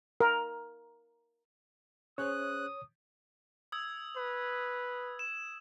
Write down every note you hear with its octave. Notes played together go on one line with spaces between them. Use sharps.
A#4
C#4 G#4 C5 C#5 D#6 F#6
D#6 E6 G#6
B4
E7